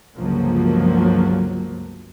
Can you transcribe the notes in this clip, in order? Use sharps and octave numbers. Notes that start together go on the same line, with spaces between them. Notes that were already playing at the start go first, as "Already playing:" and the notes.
G1 C#2 F3 F#3 A#3